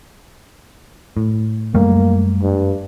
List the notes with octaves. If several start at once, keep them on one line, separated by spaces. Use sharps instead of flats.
A2
F#2 G3 A3 A#3
G2